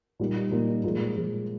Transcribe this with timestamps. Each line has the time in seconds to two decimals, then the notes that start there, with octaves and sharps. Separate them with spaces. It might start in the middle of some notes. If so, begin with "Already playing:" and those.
0.19 A#2 G3 A#3 D#4
0.51 A#2 G3 A#3 D#4
0.84 A#2 F3 G#3
1.16 A#2 F3 G#3